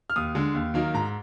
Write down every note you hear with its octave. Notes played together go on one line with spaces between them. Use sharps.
F6
D#2 D#6
D3 G#3
D#2
D#3 F#3 A#3 D#4
G#2 A#5